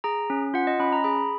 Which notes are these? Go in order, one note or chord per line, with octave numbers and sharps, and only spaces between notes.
G#4 A#5
C#4
F4 F#5
D#5
C#4 B5
A#5
G#4 B5